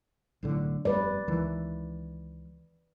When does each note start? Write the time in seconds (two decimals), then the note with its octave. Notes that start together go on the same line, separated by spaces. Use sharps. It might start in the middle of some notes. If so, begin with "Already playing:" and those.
0.43 B1 A2 D3
0.85 F1 G2 B4 D5
1.27 C#2 D#3 E3